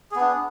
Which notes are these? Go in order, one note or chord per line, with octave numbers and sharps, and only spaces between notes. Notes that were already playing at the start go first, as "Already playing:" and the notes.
B3 D4 G#4